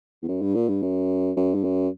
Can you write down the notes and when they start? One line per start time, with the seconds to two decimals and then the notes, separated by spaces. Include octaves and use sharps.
0.23 E2
0.28 F#2
0.42 G2
0.55 A#2
0.69 G2
0.83 F#2
1.37 F#2
1.54 G2
1.64 F#2